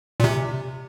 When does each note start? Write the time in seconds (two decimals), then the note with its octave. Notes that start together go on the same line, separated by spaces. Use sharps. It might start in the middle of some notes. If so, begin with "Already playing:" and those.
0.20 A#2
0.24 C3